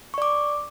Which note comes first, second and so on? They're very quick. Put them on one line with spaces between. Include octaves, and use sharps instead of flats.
C#6 D5 D6